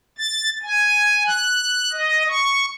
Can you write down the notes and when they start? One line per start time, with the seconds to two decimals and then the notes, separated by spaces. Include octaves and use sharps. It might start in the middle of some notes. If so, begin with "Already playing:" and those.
0.18 A6
0.63 G#5
1.27 F#6
1.93 D#5
2.29 C#6